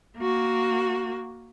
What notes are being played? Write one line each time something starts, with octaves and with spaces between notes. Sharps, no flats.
A#3 F#4